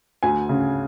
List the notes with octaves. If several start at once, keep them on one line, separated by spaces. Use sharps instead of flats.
D2 G#5
C#3